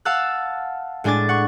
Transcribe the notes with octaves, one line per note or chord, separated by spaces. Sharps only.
F5 F#5 A5 E6 F#6
A2 G#3 D4 G#5 D6 A6
F#5 C#6